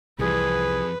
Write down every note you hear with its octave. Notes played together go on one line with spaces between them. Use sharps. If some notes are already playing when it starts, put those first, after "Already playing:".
C2 F2 E3 G3 G#4 B4